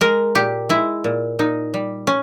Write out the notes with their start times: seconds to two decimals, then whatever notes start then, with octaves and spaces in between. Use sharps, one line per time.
0.01 G#3 A#4
0.35 A#2 G4
0.69 G#3 E4
1.04 A#2
1.39 A#2 D#4
1.74 G3
2.07 C#4